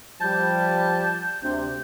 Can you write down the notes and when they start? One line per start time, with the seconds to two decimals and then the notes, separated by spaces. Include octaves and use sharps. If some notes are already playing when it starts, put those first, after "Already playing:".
0.21 F3 G3 A5 G6
1.41 D2 C3